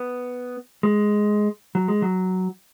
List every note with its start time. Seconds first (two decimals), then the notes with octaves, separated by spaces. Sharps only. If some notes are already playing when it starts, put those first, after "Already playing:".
Already playing: B3
0.83 G#3
1.75 F#3
1.88 G#3
2.02 F#3